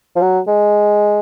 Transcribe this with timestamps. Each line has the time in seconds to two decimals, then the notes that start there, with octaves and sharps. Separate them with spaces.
0.16 F3
0.22 F#3
0.47 G#3